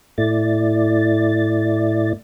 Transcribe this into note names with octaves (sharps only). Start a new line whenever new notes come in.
A2 A3 E4 D5 A6